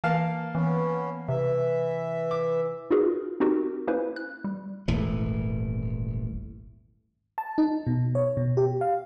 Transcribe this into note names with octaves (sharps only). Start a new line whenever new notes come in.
E3 A#3 F5 A5
E3 B3 C#4
C3 E3 E5
D6
D#4 F4 F#4 G#4 A#4 B4
C4 D#4 F#4 G4 A#4
A#3 C#4 E4 B4 C5
F#6
G3
D#1 G#1 E3 A3
A5
D#4
B2
C#5
B2
G4
F5